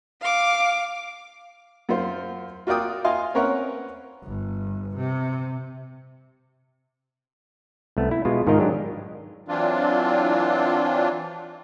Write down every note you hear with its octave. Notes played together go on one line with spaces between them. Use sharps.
F5 D6
F#2 F4 C5
F4 F#4 A#4 D5 G5 D#6
F4 D#5 F5 G#5 C6
C4 C#4 A#4 B4 C#5 F#5
G1
C3
C2 A3 B3
E4
B2 G#3 F4
G#2 D#3 F4 A#4 D#5
F#3 G#3 D4 G4
E3 F#3 C4 D4 F4